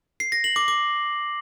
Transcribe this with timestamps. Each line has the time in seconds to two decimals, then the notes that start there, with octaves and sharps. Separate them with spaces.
0.20 C7
0.32 A#6
0.44 F#7
0.56 D6
0.68 D6